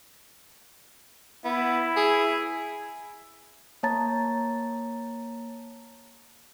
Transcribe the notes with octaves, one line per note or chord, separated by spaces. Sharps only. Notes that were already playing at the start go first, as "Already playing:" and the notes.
B3 E4
G#4
A#3 C#5 A5 A#5 A6